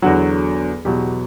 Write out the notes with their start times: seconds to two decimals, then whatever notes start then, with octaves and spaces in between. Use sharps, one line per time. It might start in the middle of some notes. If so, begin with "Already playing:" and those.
0.02 E2 D3 F#3 F#4
0.85 E2 B2 F#3 G4